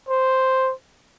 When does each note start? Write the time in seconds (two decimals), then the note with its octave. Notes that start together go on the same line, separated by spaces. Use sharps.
0.09 C5